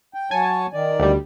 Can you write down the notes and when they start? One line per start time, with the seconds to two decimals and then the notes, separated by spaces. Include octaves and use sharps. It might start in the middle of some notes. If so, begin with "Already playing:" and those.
0.14 G5
0.31 F#3 C#5 G#5 A5
0.73 D#3 D5
1.00 D2 G3